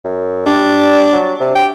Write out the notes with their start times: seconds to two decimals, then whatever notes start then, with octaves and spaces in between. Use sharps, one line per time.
0.04 F#2
0.46 G3 D4
1.13 F#3
1.40 C3
1.55 G4 G5